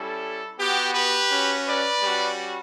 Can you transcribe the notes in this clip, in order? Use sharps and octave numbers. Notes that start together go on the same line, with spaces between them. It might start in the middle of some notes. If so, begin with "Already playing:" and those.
Already playing: G3 C#4 E4 A4
B3 F#4 G4
G4 B4
C#4 F#4
B4 D5
G3 C#4 F#4